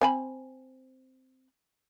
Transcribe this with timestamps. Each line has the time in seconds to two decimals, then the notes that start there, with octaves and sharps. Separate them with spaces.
0.01 C4 G#5 B5